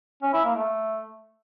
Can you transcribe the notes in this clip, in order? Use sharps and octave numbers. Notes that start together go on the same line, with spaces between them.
C#4
E4
A#3
A3